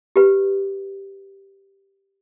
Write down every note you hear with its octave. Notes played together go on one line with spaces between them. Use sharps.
G4 B4